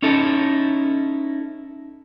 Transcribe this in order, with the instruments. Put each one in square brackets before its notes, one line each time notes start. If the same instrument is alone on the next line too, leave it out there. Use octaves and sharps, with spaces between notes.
[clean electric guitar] C#4 D#4 E4 A4